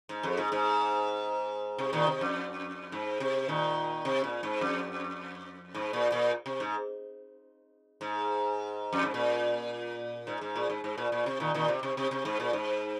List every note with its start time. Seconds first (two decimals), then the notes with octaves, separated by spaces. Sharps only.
0.09 G#2
0.23 F2
0.37 G#2
0.52 G#2
1.79 C3
1.93 A#2 D#3
2.07 C3
2.21 F2
2.92 G#2
3.20 C3
3.48 A#2 D#3
4.05 C3
4.24 A#2
4.43 G#2
4.61 F2
5.75 G#2
5.93 A#2
6.12 A#2
6.46 C3
6.60 G#2
8.01 G#2
8.93 F2
9.03 G#2
9.14 A#2
10.27 G#2
10.41 G#2
10.56 A#2
10.70 G#2
10.84 G#2
10.98 A#2
11.12 A#2
11.26 C3
11.40 A#2 D#3
11.55 A#2 D#3
11.68 C3
11.83 C3
11.97 C3
12.11 C3
12.25 G#2
12.40 A#2
12.53 G#2